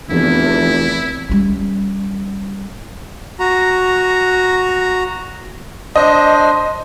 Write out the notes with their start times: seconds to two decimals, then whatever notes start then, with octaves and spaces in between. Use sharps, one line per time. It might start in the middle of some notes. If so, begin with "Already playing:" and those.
0.10 F1 E2 E4
1.30 G3 C#4
3.39 F#4 A#5
5.96 D4 C5 D#5